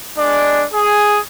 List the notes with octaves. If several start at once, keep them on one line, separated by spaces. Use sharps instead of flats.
G#3 D4 D5
G#4